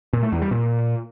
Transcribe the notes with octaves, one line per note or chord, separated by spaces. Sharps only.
A#2
A3
E2
G3
A#2